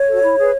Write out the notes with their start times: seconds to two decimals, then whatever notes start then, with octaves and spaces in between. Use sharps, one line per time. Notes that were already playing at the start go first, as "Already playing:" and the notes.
Already playing: C#5
0.09 F#4 A4
0.23 E4
0.38 G#4 B4